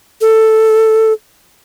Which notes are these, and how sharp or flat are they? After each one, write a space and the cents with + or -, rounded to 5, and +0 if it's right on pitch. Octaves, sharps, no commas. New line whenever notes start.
A4 +5